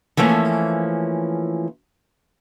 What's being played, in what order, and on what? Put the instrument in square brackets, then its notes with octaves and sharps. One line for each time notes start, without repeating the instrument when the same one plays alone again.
[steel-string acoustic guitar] E3 F3 A3 A#3 C#4